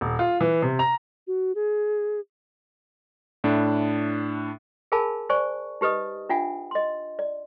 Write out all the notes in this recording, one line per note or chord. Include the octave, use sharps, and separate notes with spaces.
D#1
F4
E3
C3
A#5
F#4
G#4
A2 D4 E4 F#6
G#4 A#4 F5 G#5 A5 B5
C5 D5 G#5 C#6
D#4 G4 B4 D#5 D#6
D4 F4 E5 F#5 G#5
D#5 C6
D5